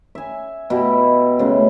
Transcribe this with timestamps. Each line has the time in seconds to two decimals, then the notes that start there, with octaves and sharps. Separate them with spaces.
0.15 E5 G#5
0.70 B2 E4 G4
1.39 C#3 G#3 A3